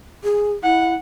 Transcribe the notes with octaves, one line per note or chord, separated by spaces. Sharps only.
G#4
E4 F#5